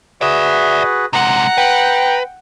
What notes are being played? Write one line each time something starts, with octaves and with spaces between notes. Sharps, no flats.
F#4 G#4 B4 D5 E5
C3 G#3 F#5 A#5
B4 G5